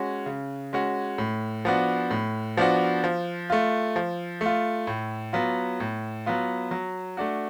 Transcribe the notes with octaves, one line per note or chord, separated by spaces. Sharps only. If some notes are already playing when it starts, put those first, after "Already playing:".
Already playing: G#3 C#4 F#4
C#3
G#3 C#4 F#4
A2
F3 B3 D4 F#4
A2
F3 B3 D4 F#4
F3
A3 F4
F3
A3 F4
A2
F#3 B3 F4
A2
F#3 B3 F4
F#3
A3 D4 F#4